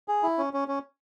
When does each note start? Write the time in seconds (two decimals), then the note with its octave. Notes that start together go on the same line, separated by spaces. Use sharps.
0.08 G#4
0.23 E4
0.38 C#4
0.53 C#4
0.68 C#4